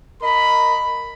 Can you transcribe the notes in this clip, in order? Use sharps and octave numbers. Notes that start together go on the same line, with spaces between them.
A#4 D#5 B5